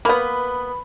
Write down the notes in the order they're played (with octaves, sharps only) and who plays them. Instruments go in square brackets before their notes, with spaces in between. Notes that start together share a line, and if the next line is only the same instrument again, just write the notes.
[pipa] A#3 B3 [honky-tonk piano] B4 B5